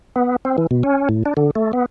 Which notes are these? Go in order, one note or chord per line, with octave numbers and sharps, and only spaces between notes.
B3
C4
E3
B2
C#4
A2
D4
D3
A3
B3